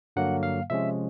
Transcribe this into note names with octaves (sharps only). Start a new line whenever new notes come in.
G2 D3 F#3 A#3 F#5
F5
C3 F3 G#3 C#4 E5